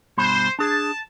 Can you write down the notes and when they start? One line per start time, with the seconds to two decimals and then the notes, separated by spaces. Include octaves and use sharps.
0.17 G2 B2 C5 B5
0.59 D4 G#4 A5